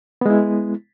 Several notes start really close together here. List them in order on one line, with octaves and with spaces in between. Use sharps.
B3 G#3 E4